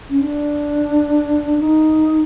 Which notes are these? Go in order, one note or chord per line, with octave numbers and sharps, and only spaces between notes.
C#4
D4
D#4